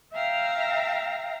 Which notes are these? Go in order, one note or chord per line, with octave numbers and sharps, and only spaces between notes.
E5 F5 G5 A#5